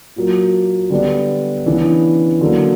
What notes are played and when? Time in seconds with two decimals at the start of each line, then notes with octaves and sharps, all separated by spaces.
0.16 A#2 F#3 A#3
0.90 D3 G3 B3 D4
1.66 C#3 E3 B3 D4
2.41 D3 F#3 A#3